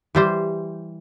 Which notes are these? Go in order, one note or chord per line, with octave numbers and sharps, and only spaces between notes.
E3 G3 C5